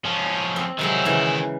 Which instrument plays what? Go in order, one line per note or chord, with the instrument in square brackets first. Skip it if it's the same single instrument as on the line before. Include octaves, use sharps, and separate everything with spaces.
[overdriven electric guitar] F3 C#4
[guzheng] C4
[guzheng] C3 F#3 G#3 [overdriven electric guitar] D#3 E4
[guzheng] C#3 E3